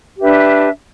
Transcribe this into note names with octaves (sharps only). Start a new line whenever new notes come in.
D4 G4 B4 E5